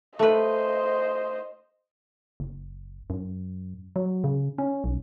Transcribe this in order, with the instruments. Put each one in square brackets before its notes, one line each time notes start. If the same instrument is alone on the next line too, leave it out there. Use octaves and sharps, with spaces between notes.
[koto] A3 B4 [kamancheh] C5 D#5
[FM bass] F#1
F#2
F#3
C#3
C#4
B1